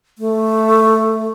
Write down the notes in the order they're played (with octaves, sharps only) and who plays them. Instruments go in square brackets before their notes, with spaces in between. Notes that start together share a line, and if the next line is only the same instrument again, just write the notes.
[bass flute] A3